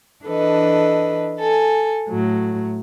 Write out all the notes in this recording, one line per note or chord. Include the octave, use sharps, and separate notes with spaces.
E3 D4 A4 B4 D#5
A4 G#5
A2 F#3